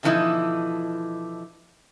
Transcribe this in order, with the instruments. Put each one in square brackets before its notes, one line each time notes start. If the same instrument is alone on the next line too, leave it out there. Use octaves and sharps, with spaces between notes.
[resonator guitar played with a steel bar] B2 D3 E3 F3 D#4 E4